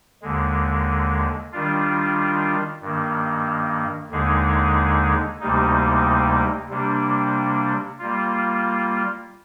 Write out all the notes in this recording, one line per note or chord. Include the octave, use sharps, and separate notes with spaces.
D#2 D3 G#3
D#3 G3 D4 F4
G2 D#3 A#3
D#2 D3 G#3 D#4 G#4
D2 C3 G3 A#3 D#4
C3 G3 A#3 D4
G3 A#3 F4